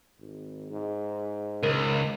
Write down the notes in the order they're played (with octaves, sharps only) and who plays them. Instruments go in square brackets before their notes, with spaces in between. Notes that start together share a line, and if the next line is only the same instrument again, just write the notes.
[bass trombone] G#1
G#2
[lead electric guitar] C#2 [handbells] A#4